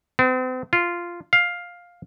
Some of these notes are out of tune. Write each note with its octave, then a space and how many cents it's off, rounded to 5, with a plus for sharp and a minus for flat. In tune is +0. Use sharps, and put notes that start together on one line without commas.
C4 -40
F4 -10
F5 +10